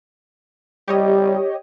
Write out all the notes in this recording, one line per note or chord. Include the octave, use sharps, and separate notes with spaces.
G3 G4 C#5 D#5